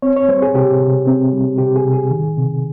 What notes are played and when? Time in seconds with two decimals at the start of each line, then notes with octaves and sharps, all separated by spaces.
0.02 C4 C#5
0.16 C#5
0.29 G3 C5
0.42 G#4
0.54 C3 G4
0.80 C3
1.07 C4
1.33 G3
1.58 C3 G4
1.76 G#4
1.85 C3
1.93 G#4
2.11 D#3
2.37 C3